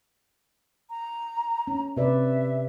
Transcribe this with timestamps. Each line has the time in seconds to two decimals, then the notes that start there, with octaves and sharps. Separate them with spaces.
0.90 A#5
1.67 C#4
1.97 C3 B4 D5 E5